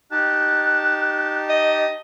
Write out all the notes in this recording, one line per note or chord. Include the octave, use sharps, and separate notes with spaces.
D#4 G4 A5 F#6
D#5